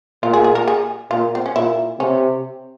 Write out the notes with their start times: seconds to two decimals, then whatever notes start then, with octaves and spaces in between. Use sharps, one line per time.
0.23 A#2 F4
0.33 G#4
0.44 G#4
0.55 A#4
0.68 G#4
1.11 A#2 F4
1.35 C4
1.46 C#4
1.56 A#2 E4
2.00 C3 C#4